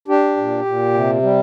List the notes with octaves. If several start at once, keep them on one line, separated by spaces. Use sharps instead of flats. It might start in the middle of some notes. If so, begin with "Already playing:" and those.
D4 G4
A#2
A#2
C3
G3